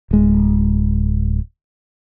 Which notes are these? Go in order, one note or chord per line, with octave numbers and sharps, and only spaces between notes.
D1 G#3